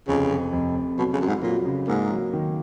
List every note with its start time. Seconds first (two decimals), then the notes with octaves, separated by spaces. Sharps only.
0.08 F1 C#3
0.31 F2
0.52 F1
0.76 F1
0.98 B2 F#3
1.13 C#3
1.20 F#2 F#3
1.28 G#2
1.42 A#2 F#3
1.65 C#3
1.87 G#2 A#3
2.10 F#3
2.33 D#3